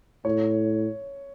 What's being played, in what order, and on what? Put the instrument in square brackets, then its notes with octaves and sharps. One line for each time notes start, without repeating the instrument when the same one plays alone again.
[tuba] A2 [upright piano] C#5